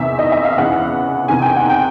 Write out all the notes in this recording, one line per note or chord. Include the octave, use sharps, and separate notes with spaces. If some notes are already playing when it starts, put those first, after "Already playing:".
Already playing: E2 C3 D#3 E5
D#5
E5
F5
E2 C#3 E3 F#5
E2 C3 D#3 G#5
G5
F#5
G5